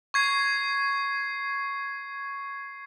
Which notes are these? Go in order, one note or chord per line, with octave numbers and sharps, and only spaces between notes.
C#6 G#6 C7